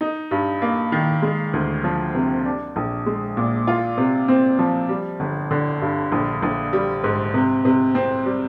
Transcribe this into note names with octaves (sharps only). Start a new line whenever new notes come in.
D#4
G2
A#3
D#3
G#3
D2
F3
C3
D4
A#1
G#3
A#2
F4
C3
C4
F3
G3
G1
D3
G2
A#1
A#1
G3
G#2
C3
C3
C4
G3